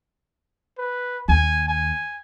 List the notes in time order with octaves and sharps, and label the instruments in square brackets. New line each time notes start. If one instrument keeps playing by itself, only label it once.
[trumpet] B4
[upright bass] D#2 [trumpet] G#5
[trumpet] G#5